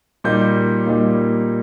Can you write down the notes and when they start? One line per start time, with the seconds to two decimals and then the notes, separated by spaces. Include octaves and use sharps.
0.24 A#2 G3 A#3 D#4 G6
0.86 A#2 G3 A#3 D#4